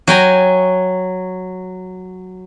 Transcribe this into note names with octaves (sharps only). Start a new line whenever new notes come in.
F#3 G5 G#5 A#5